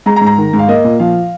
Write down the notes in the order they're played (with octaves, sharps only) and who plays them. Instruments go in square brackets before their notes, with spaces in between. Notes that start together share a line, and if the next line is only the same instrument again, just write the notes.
[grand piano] G#3 A#5
A#5
G#2
A#5
D#3
G#2
F5
A#3 D#5
A#2
F3 F5